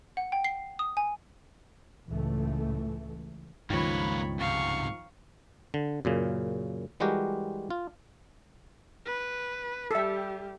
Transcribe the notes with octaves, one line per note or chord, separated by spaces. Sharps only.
F#5
G5
C7
D#6
G#5
C#2 A2 E3 A3
C#2 G2 D#3 F3 A#3 B4 C#5 B5
G#2 C3 F5 C#6
D3
F#2 A#2 C#3
E3 G3 G#3 F#4 G4 A#4
F4
B4
G3 G4 A4 E5